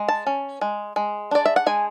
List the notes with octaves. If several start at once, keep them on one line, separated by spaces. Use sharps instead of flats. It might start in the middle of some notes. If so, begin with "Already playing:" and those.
Already playing: G#3
A5
C#4
G#3
G#3
D4 D5
E5
F#5
G#3 G#5